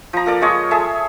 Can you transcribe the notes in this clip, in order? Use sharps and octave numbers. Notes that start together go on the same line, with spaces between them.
F3 A#5
A#3 A4 D5
G#3 F4 C#5 D#5
G#4 A4 E5